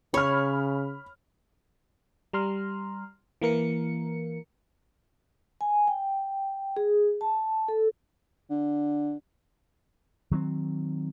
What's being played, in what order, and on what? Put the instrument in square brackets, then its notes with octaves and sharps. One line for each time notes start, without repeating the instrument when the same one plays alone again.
[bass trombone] C#3 [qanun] C#5 [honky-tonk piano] B5 F6
[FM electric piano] G3 A#5 C6 F6
E3 A#3 A#4 C#7
[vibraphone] G#5
G5
G#4
A5
A4
[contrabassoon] D3
[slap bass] D#3 F#3 A#3 C4